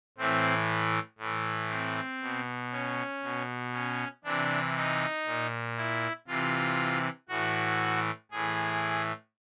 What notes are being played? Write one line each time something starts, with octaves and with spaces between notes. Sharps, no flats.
A2 E3 C4
A2 E3
C4
B2
C#4
B2
C#4
C3 E3 D4
D#4
A#2
E4
C3 E3 F4
A2 E3 F#4
A2 E3 G#4